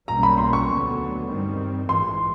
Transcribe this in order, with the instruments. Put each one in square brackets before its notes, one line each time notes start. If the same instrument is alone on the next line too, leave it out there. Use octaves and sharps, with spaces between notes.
[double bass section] B1 B2 G3 A#3 C#4 [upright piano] A#5
[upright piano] B5
C6
C#6
[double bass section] D2 D3 F#3 B3
G2 D#3 G3 C4
[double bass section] A#1 G#2 E3 G#3 [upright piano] C6